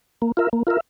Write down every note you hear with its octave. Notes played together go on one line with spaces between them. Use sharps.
A#3
F4 A#4 E5
A#3
F4 A#4 E5